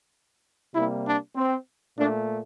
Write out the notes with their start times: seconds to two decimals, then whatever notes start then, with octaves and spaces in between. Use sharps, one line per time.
0.74 C3 G3 A#3 E4
1.05 D4
1.36 C4
1.97 A#2 A3 D4